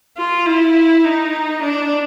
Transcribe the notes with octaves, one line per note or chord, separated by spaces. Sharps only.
F4
E4
D#4
D4